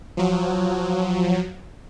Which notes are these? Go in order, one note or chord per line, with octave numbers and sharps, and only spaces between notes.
F3 F#3